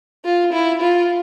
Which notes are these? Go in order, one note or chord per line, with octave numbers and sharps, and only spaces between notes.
F4
E4
F4